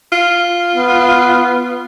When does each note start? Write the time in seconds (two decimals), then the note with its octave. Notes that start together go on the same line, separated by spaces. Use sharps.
0.12 F4
0.76 B3